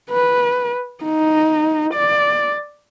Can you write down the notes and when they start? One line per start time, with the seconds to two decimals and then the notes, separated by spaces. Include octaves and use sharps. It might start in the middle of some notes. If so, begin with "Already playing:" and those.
0.10 B4
1.04 D#4
1.94 D5